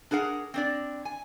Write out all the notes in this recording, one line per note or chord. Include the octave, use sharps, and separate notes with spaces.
D4 G#4 A#4 F#5
C4 D4 D5
G#5